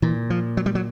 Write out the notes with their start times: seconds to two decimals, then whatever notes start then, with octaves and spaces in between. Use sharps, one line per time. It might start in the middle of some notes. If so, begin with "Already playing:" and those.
0.02 A#2 E3
0.30 F3
0.57 F#3
0.66 G3
0.75 F#3